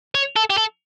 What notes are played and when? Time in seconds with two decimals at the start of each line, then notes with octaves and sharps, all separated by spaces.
0.15 C#5
0.36 A4
0.50 G4
0.58 A4